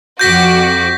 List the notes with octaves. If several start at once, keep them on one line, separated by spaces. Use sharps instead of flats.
F2 F#4 D6 G6 A#6 B6